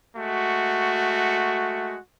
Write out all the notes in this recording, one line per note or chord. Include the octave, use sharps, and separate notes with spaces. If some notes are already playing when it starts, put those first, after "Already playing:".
G#3 A3 F#4